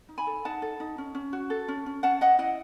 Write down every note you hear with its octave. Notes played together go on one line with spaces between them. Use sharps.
D#4
G#5 B5
A4
D#4 F#5 A5
A4
D#4
C#4
C#4
F#4
A4
C#4
C#4
C#4 F#5 A5
C#4 D#5 F#5
E4 D#5 F#5